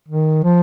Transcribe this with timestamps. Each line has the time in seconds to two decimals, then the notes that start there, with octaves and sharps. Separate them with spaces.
0.09 D#3
0.44 F3